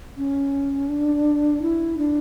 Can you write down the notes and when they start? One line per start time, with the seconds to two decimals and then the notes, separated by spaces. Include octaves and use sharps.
0.17 C#4
0.89 D4
1.62 E4
1.98 D4